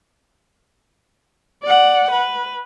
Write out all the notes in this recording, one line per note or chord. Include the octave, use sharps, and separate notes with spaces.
D5 F#5
B4